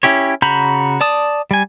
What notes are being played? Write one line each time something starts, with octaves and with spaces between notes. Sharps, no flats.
C#4 E4 G4 C#5
C#3 F#4 A#5 B5 G6
D5 A5 D#6
G3 G#5